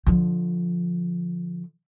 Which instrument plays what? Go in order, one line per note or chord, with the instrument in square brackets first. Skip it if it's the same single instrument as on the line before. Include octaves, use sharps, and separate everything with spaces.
[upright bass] D3 F3